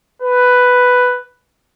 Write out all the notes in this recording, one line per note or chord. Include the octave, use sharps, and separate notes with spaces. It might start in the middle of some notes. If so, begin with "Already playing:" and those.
B4